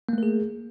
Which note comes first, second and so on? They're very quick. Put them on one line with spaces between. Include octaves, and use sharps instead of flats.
A#3 A3 A#4 G#4